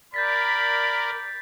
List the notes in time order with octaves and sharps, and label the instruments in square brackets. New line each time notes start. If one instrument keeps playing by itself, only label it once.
[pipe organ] A#4 D5 [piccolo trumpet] B5 [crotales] G6 A6 B6